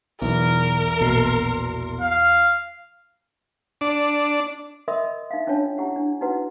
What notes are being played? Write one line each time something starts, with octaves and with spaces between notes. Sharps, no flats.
B1 E2 A#4
A#1 B2 C6
F5
D4
A#4 D#5 E5 B5 C6 D#6
D#4 E5 F5
C#4 D4 F4 C#5 A5
E4 G4 F#5
D4
D#4 E4 F#4 B4 F#5